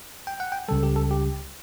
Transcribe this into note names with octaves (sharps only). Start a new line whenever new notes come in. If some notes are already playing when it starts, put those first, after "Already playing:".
G5
F#5
G5
C#2 C#3 G3 A4
G4
A4
G4